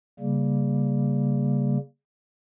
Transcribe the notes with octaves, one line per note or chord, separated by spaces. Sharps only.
C#3 G3 A#3